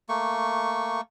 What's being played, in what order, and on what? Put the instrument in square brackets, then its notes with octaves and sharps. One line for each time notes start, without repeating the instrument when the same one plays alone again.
[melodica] A3 A#3 C#6